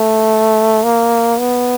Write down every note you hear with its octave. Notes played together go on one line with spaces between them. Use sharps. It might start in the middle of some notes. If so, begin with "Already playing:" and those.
Already playing: A3
A#3
B3